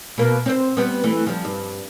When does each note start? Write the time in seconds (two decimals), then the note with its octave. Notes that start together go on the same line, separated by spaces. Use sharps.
0.18 B2 A#3
0.46 C4 C5
0.77 G3 B3
1.04 E3 A3
1.26 F3 G3
1.45 G2